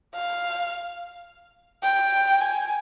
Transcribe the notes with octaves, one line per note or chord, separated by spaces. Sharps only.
F5
G5
G#5